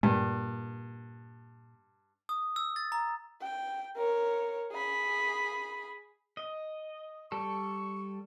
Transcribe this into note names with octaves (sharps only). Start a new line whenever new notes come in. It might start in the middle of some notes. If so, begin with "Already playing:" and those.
G2 A#2
D#6
E6
A6
A#5
G5
A#4 C#5
G#4 B5
D#5
G3 A4 C#6